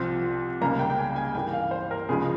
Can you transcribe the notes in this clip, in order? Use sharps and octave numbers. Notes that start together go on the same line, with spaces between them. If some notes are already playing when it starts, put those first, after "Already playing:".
Already playing: C2 C3 F3 C4
C#2 C#3 G3 A#3 A#5
G5
G5
G#5
G#5
G2 E3 A#3 G5
F5
C5
A#4
C#2 C#3 F3 G#3 G#4